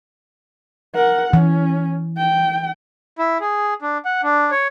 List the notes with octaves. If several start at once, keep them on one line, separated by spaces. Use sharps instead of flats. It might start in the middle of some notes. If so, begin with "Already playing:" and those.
A#4 F#5
E3 C#4
G5
E4
G#4
D4
F#5
D4
C#5